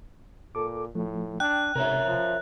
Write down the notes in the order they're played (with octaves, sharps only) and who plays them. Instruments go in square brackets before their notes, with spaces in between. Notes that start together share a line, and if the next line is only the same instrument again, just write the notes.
[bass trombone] A#2 [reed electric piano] A4 D6
[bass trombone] A2 [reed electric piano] F3 A3
[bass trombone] D4 [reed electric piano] G5 [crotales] F#6
[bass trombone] G#2 [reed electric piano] C3 [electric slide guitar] A#4 C#5 E5
[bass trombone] F3